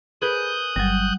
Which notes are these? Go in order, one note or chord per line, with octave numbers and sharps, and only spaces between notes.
G#4 A#4 B4 D#6 F#6 G6
G1 F#3 G3